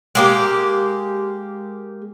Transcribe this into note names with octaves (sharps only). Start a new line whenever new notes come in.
G#3 A#3 G4